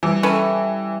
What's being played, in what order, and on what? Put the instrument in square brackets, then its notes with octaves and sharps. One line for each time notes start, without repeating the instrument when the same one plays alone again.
[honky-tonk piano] E3 [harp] G3
[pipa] C#4 A4 B4 [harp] E4